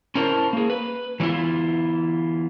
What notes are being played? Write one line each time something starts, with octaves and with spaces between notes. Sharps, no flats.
C#4 D4 E4 A#4 C5 A5
A#3 G#4
B4
E3 F#3 B3 E4 F4